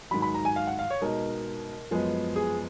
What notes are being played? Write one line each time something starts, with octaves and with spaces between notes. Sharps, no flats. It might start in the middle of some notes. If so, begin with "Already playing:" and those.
G#2 D#3 F#3 B5
B5
A#5
G#5
F5
F#5
F5
C#5
B2 G#3 D#4 A#4
F#2 F3 G#3 B3
G#4